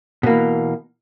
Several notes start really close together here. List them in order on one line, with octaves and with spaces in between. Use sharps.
B2 A#3 E3